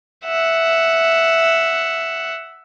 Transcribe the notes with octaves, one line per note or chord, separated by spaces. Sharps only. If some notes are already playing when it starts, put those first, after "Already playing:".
E5 F#5